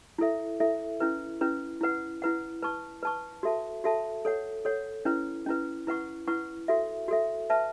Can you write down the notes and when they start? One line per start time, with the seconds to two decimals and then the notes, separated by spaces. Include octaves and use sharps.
0.18 E4 A4 E5
0.60 E4 A4 E5
1.00 C#4 E4 B4
1.41 C#4 E4 B4
1.81 E4 B4 F#5
2.22 E4 B4 F#5
2.62 B4 A5 C#6
3.03 B4 A5 C#6
3.43 F#4 A4 E5 A5
3.84 F#4 A4 E5 A5
4.25 A4 C#5 F#5
4.65 A4 C#5 F#5
5.05 C#4 E4 B4
5.46 C#4 E4 B4
5.87 E4 B4 F#5 C#6
6.27 E4 B4 F#5 C#6
6.68 F#4 A4 E5
7.08 F#4 A4 E5
7.50 B4 E5 A5